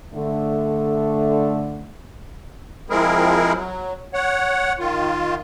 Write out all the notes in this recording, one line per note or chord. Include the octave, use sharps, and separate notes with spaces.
D3 A3
F3 G#3 C4 E4 G#4 A#4
F#3
C#5 F#5
D#3 F4